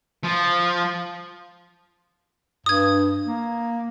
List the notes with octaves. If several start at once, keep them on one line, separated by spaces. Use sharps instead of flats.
F3
G2 D#6 G#6
A#3